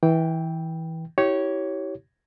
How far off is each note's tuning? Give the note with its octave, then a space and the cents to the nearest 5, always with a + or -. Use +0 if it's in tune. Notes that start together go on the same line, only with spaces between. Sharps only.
E3 -20 G5 +0
E4 -30 G4 -25 C#5 +0